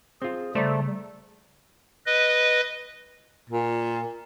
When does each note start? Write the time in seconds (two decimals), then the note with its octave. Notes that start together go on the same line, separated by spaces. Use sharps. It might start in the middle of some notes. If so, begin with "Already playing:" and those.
0.22 C4 F4 G#4
0.55 C#3 G3 A3 C5 D5 A#5
2.06 B4 D#5
3.50 A#2